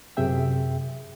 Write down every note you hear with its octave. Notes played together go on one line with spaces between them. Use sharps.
F#2 C3 G#4 E5 G5